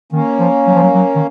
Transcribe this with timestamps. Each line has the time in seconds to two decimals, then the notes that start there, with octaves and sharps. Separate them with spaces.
0.12 D#3 A#3 C#4
0.39 F3
0.67 F#3
0.75 F3
0.83 F#3
0.94 F#3
1.16 D#3